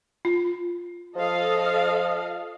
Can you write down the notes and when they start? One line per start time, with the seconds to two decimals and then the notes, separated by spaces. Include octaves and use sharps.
0.25 F4
1.16 F3 A4 D#5 F5